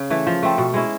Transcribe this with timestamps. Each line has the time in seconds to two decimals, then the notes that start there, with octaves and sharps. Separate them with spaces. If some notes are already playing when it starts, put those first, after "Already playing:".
Already playing: C#3 C#4
0.10 E3 A3
0.27 F3
0.43 A3 C4
0.58 B2
0.74 G#3 C#4 E4